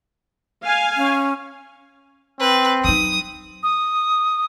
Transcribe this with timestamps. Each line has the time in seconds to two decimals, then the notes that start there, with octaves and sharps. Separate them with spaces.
0.64 F5 G#5
0.96 C#4
2.40 C4 B4
2.84 F#3 D#4 D#6
3.63 D#6